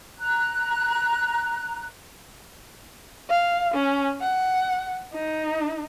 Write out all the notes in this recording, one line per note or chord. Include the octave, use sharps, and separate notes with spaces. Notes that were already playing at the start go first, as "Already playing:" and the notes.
A#5 F#6
F5
C#4
F#5
D#4